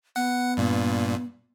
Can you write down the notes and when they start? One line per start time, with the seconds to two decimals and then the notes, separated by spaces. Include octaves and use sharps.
0.16 B3 F#5
0.57 G2 A#2